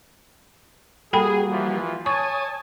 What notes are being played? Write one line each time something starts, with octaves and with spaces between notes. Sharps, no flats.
G3 A#3 F#4 G#4 A4 G5 B5
E3 F3 F4
C#5 G#5 A5 C#6 D#6